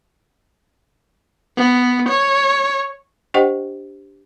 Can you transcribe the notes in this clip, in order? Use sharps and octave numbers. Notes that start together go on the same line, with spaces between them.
B3
C#5
D4 G4 C5 D#5 F#5 G5